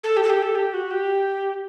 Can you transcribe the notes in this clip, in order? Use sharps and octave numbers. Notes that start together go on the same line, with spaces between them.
A4
G4
A4
G4
A4
G4
F#4
G4